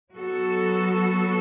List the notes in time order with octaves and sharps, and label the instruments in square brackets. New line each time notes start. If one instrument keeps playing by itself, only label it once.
[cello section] F#3 B3 F#4 A4